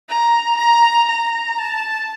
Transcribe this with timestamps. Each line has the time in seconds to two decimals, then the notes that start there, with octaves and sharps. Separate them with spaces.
0.09 A#5
0.58 A#5
1.08 A#5
1.58 A5